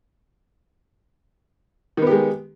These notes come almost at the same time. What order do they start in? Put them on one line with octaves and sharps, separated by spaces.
D#3 B3 G4 G#3